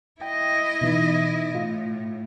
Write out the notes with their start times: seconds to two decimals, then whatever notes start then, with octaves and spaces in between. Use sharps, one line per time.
0.21 E4 D#5 G5
0.81 B2 E3 D#4
1.55 A2 F4